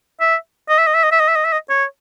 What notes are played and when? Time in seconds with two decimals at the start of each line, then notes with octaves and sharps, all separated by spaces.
0.20 E5
0.69 D#5
0.78 E5
0.87 D#5
0.94 E5
1.03 D#5
1.12 E5
1.20 D#5
1.28 E5
1.35 D#5
1.44 E5
1.52 D#5
1.69 C#5